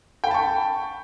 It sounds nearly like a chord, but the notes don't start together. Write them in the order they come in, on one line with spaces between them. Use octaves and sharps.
G5 B5 A5 C#6